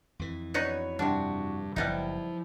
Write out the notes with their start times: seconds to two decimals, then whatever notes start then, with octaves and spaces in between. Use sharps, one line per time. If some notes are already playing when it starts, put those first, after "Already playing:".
0.19 F2 E3
0.54 B3 D#4 F#4 B4 C#5
0.99 G2 C3 D4 F#4
1.76 F#1 F3 G3 B3 D#4 E4